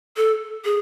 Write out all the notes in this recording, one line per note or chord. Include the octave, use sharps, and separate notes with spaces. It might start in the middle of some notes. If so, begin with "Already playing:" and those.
A4
G#4